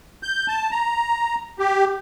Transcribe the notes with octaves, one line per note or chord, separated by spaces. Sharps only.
G6
A5
A#5
G4